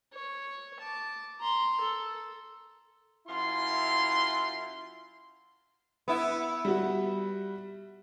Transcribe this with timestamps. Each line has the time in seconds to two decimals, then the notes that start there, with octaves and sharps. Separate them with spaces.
0.13 C#5
0.80 A5 D6
1.40 A#5 C6
1.81 A4
3.28 F#2 E4 F4 C6
6.08 B3 E4
6.65 G3 F#4